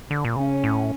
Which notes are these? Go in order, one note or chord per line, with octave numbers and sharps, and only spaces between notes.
D3
A#2
C#3 C#4
A2